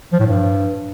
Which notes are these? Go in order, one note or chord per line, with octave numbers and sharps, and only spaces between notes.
F3
A2
G2